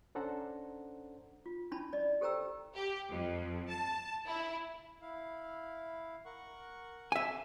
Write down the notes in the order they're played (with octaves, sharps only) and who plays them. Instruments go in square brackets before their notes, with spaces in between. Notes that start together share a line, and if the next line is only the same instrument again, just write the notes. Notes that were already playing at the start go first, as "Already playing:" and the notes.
[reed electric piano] C#4 D4 A4 C5 F#5 A#5
[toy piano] F4
C#4 D4 E4 A5 B5
D5 D#5
G4 A4 C5 G5 A#5 E6
[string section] G4
F2
A5
E4
[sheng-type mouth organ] E4 F5
A#4 F#5 C#6
[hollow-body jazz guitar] E5 G#5 [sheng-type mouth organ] F5